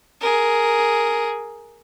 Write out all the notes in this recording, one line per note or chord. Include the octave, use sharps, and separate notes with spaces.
G#4 A#4